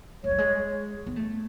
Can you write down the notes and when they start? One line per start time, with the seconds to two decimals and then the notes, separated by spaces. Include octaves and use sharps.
0.24 G#3 C#5
0.31 F#3
0.38 G#3
1.07 B3
1.16 A3